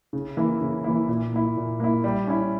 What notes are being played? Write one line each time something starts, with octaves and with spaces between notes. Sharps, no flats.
C#3
E3 A#3 E4
C#3
E3 A#3 E4
A#2
A#3 E4
A#2
A#3 E4
G3
C#4 E4